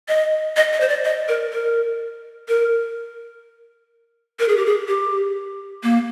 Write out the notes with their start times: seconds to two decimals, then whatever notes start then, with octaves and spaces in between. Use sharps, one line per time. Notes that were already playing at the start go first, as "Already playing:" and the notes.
0.08 D#5
0.57 D#5
0.73 D#5
0.81 C5
0.89 D5
1.05 D#5
1.28 A#4
1.52 A#4
2.49 A#4
4.39 A#4
4.49 G#4
4.57 G4
4.66 G#4
4.88 G4
5.83 A#3